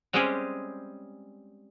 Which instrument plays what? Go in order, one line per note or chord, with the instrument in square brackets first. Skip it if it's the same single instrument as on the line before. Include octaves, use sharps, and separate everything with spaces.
[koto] G3 G#3 C4 C#4 G4 G#4